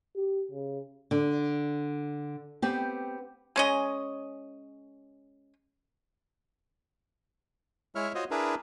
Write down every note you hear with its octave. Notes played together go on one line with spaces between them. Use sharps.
G4
C#3
D3
B3 C4 G4
G#3 C#4 D#5
G#3 E4 C#5 E5 F6
F4 F#4 C5 C#5 D#5
D4 E4 G#4 A#4 B4